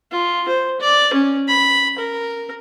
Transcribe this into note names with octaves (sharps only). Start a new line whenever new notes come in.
F4
C5
D5
C#4
B5
A#4